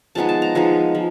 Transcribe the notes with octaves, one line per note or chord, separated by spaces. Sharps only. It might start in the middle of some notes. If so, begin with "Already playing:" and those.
F3 G#3 B3 D#4 A5
A5
A#5
F3 G#3 B3 D#4
F3